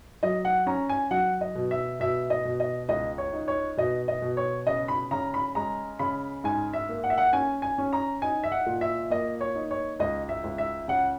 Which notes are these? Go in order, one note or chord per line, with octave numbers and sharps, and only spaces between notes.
F#3 D#5
F#5
C#4 A#5
G#5
F#3 F#5
D#5
B2
E5
B2 E5
D#5
B2
D#5
C#2 D#5
C#5
D#4
C#5
B2 D#5
D#5
B2
C#5
C#3 D#5
B5
C#3 A#5
B5
G#3 A#5
C#3 B5
G#2 G#5
E5
A#3
F#5
E5
F#5
C#4 G#5
G#5
C#4
A#5
D#4 G#5
E5
F#5
A#2
E5
A#3 D#5
C#5
D#4
C#5
C#2 D#5
E5
C#2
E5
C#3 F#5